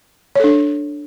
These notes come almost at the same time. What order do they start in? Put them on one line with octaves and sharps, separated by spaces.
C#5 A4 D4